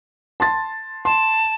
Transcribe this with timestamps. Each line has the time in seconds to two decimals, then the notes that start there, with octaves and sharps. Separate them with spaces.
0.40 A5 C6 A6
1.05 A5 C6